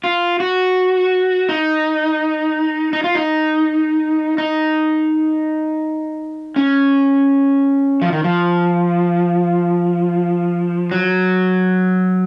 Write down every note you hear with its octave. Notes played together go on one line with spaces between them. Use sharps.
F4
F#4
D#4
D#4
F4
D#4
D#4
C#4
F3
D#3
F3
F#3